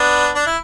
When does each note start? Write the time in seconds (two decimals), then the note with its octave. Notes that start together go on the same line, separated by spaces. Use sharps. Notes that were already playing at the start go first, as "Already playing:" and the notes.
Already playing: B3 D4
0.35 D4
0.46 E4